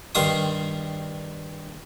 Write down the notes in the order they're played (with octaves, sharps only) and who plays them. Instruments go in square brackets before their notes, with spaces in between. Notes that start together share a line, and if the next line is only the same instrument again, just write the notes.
[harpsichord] G2 D#3 F5 C6 D#6